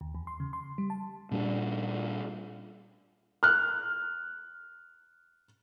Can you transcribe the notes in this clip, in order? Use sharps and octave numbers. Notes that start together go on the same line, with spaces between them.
D#2
E2
C6
C#3
C6
G3
A5
A#2 G3 D4
F6 F#6